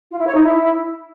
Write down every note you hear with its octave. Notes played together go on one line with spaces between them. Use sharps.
F4
E4
C#5
D#4
E4